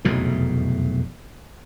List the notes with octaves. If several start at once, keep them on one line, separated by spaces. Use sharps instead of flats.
F1 B1 E2 A2